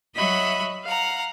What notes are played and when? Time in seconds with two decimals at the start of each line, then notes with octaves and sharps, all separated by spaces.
0.17 F#3 D#5 E5 B5 C#6 F#6
0.84 F5 F#5 A#5